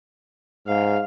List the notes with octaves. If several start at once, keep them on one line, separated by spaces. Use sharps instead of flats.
G#2 F5